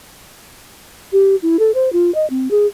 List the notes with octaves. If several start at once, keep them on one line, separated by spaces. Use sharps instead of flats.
G4
E4
A4
C5
F4
D#5
C4
G#4